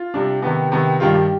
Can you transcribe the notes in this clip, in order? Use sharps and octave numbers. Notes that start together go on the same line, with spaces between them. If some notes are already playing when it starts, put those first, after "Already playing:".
Already playing: F4
C3 G3 D4
C3 D#3 B3 G4
C3 D#3 B3
G2 D#3 G3 F4
G4